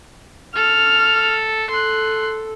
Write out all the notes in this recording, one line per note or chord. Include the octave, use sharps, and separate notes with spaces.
A4 F6
A4 C6 F#6